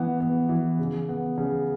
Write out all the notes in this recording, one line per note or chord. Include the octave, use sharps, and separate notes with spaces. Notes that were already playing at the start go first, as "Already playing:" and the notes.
Already playing: E3 B3
B3
E3
C#3
B3
C#3